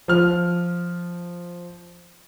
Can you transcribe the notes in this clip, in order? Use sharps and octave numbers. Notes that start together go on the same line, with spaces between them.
F3 F6